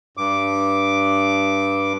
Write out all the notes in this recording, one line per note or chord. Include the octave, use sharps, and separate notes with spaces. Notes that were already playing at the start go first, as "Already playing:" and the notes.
G2 D6